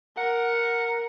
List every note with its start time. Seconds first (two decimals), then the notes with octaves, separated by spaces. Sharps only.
0.17 A#4 F#5